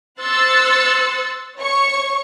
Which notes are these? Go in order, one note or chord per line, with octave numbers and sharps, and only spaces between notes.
C5 C6 E6 F#6 A6 C#7
C#5 C#6